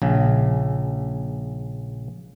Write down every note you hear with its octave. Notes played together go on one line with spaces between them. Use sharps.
A#1 C#3